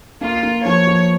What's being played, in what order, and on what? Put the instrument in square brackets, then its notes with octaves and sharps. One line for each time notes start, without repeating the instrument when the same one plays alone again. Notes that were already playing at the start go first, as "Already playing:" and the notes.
[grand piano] A#3 [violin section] F4
[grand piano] A#3
[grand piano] F3 [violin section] C#5
[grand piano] F3